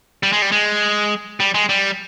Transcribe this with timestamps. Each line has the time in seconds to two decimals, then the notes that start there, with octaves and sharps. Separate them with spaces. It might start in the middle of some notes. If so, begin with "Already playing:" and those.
0.23 G3
0.33 G#3
0.42 G3
0.52 G#3
1.40 G3
1.54 G#3
1.69 G3